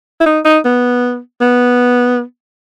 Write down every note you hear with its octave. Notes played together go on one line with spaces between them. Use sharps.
E4
D#4
D#4
B3
B3